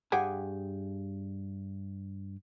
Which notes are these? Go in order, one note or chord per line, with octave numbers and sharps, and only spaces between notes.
G2 G4 G#4 F#5 G#5